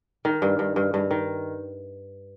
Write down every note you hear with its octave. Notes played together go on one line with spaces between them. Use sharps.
D#3
G2
G2
G2
G2
D#3